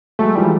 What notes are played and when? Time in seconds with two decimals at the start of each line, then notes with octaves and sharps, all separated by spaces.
0.19 F#3 G#3 A3
0.35 F3 G3
0.41 E3 F#3